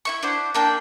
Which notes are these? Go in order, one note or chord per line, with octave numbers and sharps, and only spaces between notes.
E4 E5 C#6
D4 E4 C5 F#5
A#3 D4 G5 G6